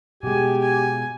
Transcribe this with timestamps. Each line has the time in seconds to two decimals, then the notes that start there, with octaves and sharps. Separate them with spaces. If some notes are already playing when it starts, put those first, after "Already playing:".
0.23 B2 G#3 G4 G#5
0.61 G#5